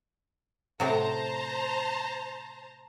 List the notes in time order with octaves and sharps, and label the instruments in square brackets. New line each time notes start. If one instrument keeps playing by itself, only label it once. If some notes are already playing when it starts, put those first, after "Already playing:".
[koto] A2 C3 F#3 [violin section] C5 A5 A#5